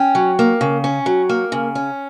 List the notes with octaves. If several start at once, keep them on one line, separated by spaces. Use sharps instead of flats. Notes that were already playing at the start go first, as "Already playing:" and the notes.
Already playing: C#4 G5
F#3
A#3
C#3
C#4
F#3
A#3
C#3
C#4